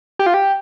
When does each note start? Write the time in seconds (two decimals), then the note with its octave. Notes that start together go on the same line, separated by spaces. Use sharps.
0.19 G4
0.26 F4
0.34 G4